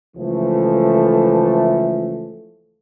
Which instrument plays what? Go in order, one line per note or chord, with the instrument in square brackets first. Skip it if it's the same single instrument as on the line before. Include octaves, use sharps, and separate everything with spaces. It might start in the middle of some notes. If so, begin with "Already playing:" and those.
[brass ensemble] C#2 E3 F3 A3